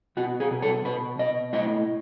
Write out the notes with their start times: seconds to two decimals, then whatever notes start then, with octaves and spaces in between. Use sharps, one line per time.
0.17 B2 F#4
0.40 G#4
0.51 B2
0.62 A4
0.85 B2 B4
1.19 B2 D#5
1.53 A2 D#5